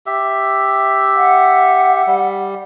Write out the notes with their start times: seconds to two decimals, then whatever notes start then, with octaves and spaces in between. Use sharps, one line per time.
0.06 G4 E5
1.15 F#5
2.07 G3